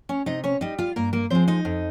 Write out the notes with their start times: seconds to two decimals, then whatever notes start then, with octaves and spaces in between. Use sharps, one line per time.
0.09 C#4 C#5
0.26 C3 D#4 D#5
0.44 C#4 C#5
0.61 G3 D#4 D#5
0.79 F4 F5
0.96 G2 A#3 A#4
1.13 A#3 A#4
1.30 F3 G#3 C4 C5
1.48 D#4 D#5
1.65 F2